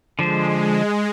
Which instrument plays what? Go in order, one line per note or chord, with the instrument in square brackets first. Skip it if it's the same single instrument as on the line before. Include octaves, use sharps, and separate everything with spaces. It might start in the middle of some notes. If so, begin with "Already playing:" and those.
[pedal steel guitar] D3 F3 C5 [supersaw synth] G#3